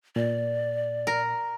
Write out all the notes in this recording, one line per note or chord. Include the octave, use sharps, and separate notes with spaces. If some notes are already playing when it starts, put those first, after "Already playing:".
A#2 D5
A#4